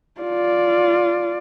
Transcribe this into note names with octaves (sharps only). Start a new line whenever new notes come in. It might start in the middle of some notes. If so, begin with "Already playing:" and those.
F4 D5